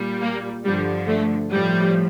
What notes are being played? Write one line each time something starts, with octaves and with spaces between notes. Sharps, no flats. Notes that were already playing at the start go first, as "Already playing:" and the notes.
Already playing: A#2 G3
A#3
G2 D3 F3 G3
A3
A2 F3 G3